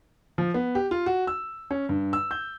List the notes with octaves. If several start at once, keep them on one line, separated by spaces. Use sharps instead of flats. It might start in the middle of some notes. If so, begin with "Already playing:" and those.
F3
B3
G4
F4
F#4
E6
C#4
G2
E6
G6